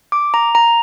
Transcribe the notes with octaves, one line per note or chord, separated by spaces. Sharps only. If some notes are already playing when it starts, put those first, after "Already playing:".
D6
A#5
A#5